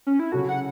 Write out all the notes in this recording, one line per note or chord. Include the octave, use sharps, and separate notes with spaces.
C#4
E4
C#3 F#3 C#4 F#4 A4
F#5